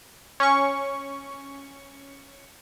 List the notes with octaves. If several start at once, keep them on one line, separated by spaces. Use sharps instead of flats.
C#4 C#6